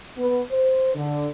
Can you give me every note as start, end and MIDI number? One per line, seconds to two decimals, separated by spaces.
0.17 0.40 59
0.51 0.92 72
0.95 1.28 50